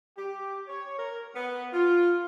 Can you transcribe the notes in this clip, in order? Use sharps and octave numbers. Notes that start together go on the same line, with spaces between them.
G4
C#5
A#4
B3
F4